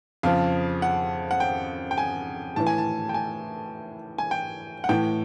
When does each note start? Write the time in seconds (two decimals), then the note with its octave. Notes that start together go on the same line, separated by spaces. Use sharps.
0.23 F2 C#3 F3 F5
0.82 F#5
1.31 F#5
1.40 G5
1.91 G5
1.98 G#5
2.56 A2 E3 A5
2.67 G#5
2.78 A5
3.09 G5
3.14 G#5
4.18 G#5
4.31 G5
4.84 F#5
4.89 A2 E3 G5